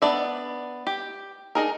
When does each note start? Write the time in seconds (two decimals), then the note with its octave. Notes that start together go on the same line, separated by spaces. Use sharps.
0.02 B3 D4 D5 E5
0.87 G4
1.55 D4 D#4 G#4 A#4